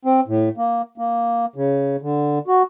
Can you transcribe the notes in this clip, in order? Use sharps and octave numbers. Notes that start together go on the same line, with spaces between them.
C4
A2
A#3
A#3
C#3
D3
F#4